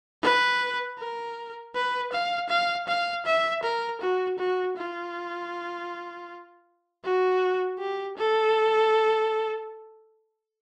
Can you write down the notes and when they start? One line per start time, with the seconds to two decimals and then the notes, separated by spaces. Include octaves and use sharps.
0.23 B4
0.99 A#4
1.75 B4
2.13 F5
2.49 F5
2.87 F5
3.26 E5
3.63 A#4
4.01 F#4
4.38 F#4
4.76 F4
7.04 F#4
7.79 G4
8.17 A4